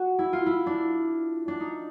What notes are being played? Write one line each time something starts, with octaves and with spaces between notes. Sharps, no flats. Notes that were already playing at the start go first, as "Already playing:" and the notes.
Already playing: F#4
E4
F4
E4
D4
D4
D#4